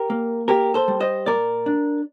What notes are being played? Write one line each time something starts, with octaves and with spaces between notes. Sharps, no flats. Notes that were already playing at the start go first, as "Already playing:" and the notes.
Already playing: G4 A#4
A#3
A#3 G4 A#4
A4 C5
G3
C5 D#5
A#2 A#4 D5
D4